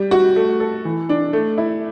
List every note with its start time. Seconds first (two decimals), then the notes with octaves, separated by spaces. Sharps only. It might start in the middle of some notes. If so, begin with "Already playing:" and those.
Already playing: G3
0.11 F#4
0.36 A3
0.60 A4
0.85 E3
1.09 D4
1.33 A3
1.58 E4